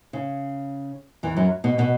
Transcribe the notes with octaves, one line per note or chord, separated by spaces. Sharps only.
C#3
E2 E3
F#2 F#3
B2 B3
B2 B3